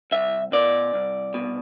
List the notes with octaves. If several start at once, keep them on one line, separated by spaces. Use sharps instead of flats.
C2 E5
B2 D5
C2
B2